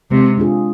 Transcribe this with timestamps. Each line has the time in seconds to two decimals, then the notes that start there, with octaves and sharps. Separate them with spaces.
0.11 C3 G#3
0.38 D4 F4 G#4